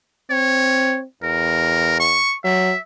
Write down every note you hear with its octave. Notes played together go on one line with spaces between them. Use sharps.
C4 C#5
E2 A#4
C#6
F#3 E5